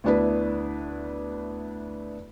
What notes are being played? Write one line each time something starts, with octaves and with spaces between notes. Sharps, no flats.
D2 B3 D4 E4 B4